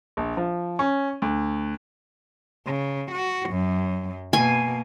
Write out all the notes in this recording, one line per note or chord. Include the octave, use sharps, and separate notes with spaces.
A#1
F3
C#4
D2
C#3
F#4
F#2
B2 A#3 G#5